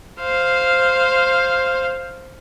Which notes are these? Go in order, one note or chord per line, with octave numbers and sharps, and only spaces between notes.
C5 F5